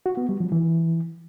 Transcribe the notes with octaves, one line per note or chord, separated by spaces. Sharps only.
F#4
B3
G3
F3
E3